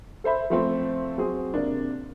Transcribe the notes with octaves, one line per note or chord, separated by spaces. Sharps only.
A4 C5 E5 B5
F3 A3 C4
F#3 C4 G#4
C3 A#3 D4